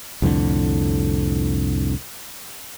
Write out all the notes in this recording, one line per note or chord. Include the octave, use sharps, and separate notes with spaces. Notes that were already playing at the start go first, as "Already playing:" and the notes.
C2 F2 A2 D3